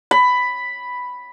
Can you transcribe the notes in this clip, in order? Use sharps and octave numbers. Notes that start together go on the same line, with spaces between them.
B5